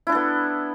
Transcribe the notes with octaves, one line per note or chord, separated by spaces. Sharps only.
B3 D4 E4 A4